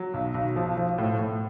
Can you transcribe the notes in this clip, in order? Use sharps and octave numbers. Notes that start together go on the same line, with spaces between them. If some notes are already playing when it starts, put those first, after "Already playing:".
Already playing: F#3
B1
B1
F3
F3
A2
A2